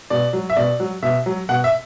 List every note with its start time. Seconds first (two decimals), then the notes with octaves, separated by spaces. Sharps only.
0.10 B2 D5
0.33 F#3
0.50 E5
0.56 B2 D5
0.80 F#3
1.02 B2 E5
1.26 F#3
1.49 B2 F#5
1.64 E5